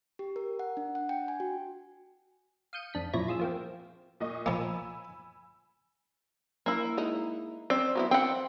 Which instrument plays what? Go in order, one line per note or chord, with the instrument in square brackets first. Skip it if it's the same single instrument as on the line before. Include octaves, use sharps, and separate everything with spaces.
[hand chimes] G4
A#4
F#5
D4
F#5
G5
G#5
F#4
[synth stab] F5 D#6 G6 C#7 D#7
F2 D4 B6
F#2 A#2 F3 E4 C#5 A#6
F4 G#4 E6
F3 A#3 C4
[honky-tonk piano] A#2 D#5 C#6
[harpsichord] F3 A#3 [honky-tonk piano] G#5 B5 E6
[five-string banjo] A#3 E4
[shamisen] G#3 D#4
[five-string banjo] C4 [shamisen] D5
[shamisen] F#3 B3 E4
[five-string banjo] C4 F#5 [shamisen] G5